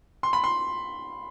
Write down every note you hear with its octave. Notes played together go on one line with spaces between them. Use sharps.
C6
B5
C6